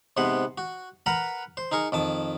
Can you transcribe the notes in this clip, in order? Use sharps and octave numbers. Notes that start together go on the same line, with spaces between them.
G#2 C3 B3 C5 F#5
F#4
A#4 B4 F#5 A#5
C5
D#4 G#4 A#4 C#6
F2 D#3 A5